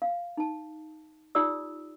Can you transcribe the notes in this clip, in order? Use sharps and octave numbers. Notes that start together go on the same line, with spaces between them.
F5
D#4 A5
D#4 F4 G4 D5 D#6 E6